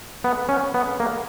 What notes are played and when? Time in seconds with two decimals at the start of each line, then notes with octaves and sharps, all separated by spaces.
0.24 B3
0.49 C#4
0.74 B3
1.00 A#3